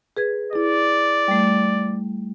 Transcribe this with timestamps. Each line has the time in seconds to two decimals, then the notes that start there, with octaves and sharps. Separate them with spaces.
0.17 G#4 B4 G#6
0.53 E4 G#4 D5
1.28 G3 A3